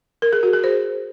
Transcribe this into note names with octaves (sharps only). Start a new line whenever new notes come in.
A#4
G#4
F#4
G#4
C5